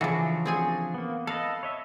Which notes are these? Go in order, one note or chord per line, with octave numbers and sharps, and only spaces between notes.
C#3 E3 F3 D4 F#4
C4 G#4 G#5
A#3 B3
A4 B4 D#5 F5
C#5 D#5 E5